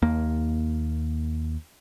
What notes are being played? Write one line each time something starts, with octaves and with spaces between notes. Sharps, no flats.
D#2 A#3